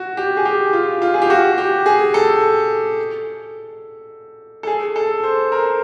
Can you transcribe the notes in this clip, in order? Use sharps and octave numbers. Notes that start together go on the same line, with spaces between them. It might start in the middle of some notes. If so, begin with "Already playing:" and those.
Already playing: F#4
G4
G#4
G4
F4
F4
G#4
G4
F#4
G4
G#4
A4
A4
G#4
A4
C5
A#4